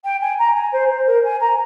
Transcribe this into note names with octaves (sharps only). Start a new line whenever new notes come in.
G5
G#5
A#5
G#5
C5
C5
A#4
G#5
A#5